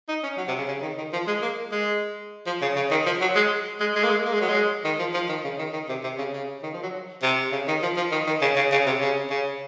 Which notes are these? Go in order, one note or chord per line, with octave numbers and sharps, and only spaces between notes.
D#4
C#4
F#3
C3
C#3
C#3
D#3
D#3
F3
G#3
A#3
G#3
F3
C#3
C#3
D#3
F3
F#3
G#3
G#3
G#3
A#3
G#3
A#3
G#3
F#3
G#3
D#3
F3
F3
D#3
C#3
D#3
D#3
C3
C3
C#3
C#3
D#3
F3
F#3
C3
C#3
D#3
F3
F3
D#3
D#3
C#3
C#3
C#3
C3
C#3
C#3